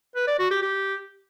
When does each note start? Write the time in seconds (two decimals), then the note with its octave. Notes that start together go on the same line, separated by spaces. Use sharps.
0.15 B4
0.27 D5
0.39 F#4
0.51 G4
0.62 G4